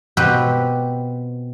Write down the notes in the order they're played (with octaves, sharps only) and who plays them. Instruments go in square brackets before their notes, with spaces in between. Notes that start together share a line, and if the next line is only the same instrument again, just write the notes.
[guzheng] B2 C4 G4 B4